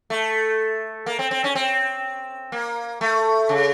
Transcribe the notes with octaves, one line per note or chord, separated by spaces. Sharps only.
A3
A#3
C4
C4
C#4
C4
A#3
A3
C#3